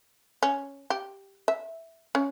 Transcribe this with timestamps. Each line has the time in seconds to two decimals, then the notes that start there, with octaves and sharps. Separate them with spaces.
0.43 C#4
0.90 G4
1.48 E5
2.15 C#4